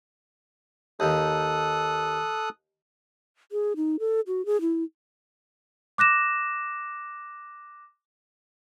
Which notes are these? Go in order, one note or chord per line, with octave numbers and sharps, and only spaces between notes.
D#2 D#3 A4 D#6 F#6
G#4
D#4
A4
F#4
G#4
E4
D6 F#6 A#6 E7